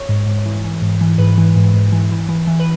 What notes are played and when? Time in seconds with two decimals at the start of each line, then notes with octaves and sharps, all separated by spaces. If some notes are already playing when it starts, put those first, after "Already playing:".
Already playing: C#5
0.09 G#2
0.26 G#2
0.46 E3
0.64 E3
0.82 G#2
1.01 E3
1.18 G#2 B4
1.38 E3
1.56 G#2
1.74 G#2
1.92 E3
2.11 E3
2.29 E3
2.47 E3
2.60 B4